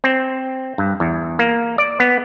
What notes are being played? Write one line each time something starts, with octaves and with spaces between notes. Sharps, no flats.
C4
G2
E2
A#3
D5
B3